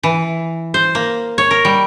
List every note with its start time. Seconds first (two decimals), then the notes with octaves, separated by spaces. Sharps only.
0.03 E3
0.74 C5
0.95 A#3
1.38 C#5
1.51 A#4
1.65 G3